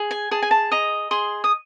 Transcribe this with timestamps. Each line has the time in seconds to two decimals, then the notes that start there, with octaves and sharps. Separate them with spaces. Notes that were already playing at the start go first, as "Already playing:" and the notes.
Already playing: G#4
0.11 G#5
0.31 G#4 A5
0.42 G#5
0.51 A5
0.71 D#5 A#5
1.11 G#4 C6
1.44 D#6